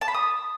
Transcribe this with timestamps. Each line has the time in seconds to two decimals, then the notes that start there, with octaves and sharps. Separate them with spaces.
0.01 A5
0.08 B5
0.14 D#6